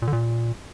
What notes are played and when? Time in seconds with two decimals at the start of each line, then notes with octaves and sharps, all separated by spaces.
0.02 A#2
0.07 D3
0.13 A#2